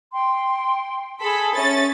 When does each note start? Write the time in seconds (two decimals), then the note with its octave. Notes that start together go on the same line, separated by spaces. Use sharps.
0.13 G5 C6
1.21 G#4 A4 B5
1.55 C#4 E5 A6